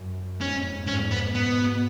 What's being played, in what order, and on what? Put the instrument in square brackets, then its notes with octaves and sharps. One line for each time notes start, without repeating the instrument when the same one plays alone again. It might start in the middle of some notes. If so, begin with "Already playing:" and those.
Already playing: [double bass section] F#2
[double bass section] F2 G#2 [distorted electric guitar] C#4
[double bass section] F2 G#2 [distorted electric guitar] C#4
[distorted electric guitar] B3
[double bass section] G#2 B2 [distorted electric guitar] B3